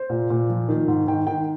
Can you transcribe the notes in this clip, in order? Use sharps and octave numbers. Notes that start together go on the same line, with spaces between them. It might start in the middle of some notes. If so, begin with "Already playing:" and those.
Already playing: C5
A#2
A#2
F3
D#3
G#2
D#3 G5
D#3 G5